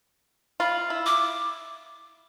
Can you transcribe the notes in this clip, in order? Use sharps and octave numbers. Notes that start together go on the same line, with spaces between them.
F4 B5
E4
D6